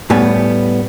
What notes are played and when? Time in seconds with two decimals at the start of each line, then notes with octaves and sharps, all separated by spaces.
0.10 A2 G3 B3 G#5